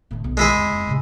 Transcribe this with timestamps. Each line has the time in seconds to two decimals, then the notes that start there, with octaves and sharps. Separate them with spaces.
0.11 A2 D3
0.24 B1
0.37 G#3 E4 G#4
0.54 F2 D3
0.70 F2 A#3
0.87 A2 C3